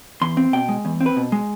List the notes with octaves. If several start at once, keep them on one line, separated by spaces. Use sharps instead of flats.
E2 C6
C4
B2 G5
G#3
E2
C4
B4
B2
G#3